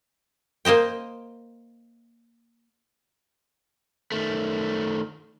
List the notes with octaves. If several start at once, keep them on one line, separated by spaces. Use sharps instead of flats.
A#3 C5 D#5 G5
D#3 A3